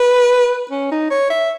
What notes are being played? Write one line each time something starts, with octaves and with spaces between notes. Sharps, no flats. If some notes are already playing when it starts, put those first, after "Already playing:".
Already playing: B4
C#4
D#4
C#5
E5